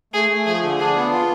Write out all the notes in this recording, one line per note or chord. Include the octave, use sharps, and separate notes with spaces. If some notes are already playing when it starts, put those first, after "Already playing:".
A3 G#4
A3
F3 G#4
D3
D4 G#4
B3
F4